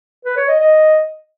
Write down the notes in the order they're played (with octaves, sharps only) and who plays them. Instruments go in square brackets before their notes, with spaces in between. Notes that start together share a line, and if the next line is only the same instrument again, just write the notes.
[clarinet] B4
C#5
D#5
D#5